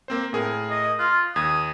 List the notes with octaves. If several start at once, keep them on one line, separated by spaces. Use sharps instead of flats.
A#3 C4 C5
A2 G#4 A#4
D#5
F4 F#6
D#2 D#6 G#6